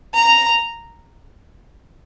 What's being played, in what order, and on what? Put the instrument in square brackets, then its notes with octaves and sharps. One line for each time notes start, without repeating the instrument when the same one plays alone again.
[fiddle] A#5